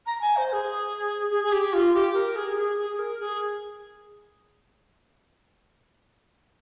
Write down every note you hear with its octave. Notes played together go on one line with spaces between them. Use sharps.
A#5
G#5
C5
G#4
G#4
G#4
G4
F4
G4
A#4
G#4
G#4
G#4
A#4
G#4